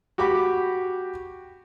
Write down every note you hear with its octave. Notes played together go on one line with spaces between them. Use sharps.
F#4 G4 B5 D6